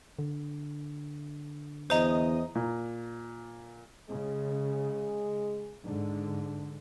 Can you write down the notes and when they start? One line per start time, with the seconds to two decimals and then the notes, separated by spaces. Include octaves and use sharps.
0.19 D3
1.90 E2 C5 D#5 A#5 D#6
2.55 A#2
4.10 C#3 G#3
5.85 G#2 D3 D4